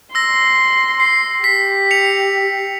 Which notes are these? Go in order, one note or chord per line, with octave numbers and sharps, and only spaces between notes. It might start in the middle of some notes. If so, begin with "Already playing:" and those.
C6 E6 A#6
C7
G4 B6
C#7 F7